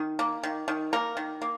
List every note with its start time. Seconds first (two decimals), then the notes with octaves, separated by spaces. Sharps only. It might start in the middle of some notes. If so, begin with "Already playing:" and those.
Already playing: D#3
0.19 A#3
0.43 D#3
0.68 D#3
0.93 A#3 A#4
1.17 D#3
1.42 A#3